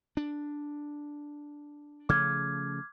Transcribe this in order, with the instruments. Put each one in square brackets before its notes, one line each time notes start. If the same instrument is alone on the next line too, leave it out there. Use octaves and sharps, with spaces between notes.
[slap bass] D4
[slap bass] C#3 F3 A3 [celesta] D6 F6 G#6